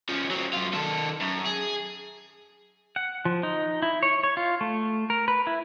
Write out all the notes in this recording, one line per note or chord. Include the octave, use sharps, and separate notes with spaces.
F3 C#4
F#3 C4
F#2 F4
D#3 A4
F#2
G#4
F#5
F3
D#4
E4
C#5
C#5
F4
A3
A#4
B4
E4